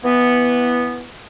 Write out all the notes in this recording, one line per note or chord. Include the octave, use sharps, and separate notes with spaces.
E3 B3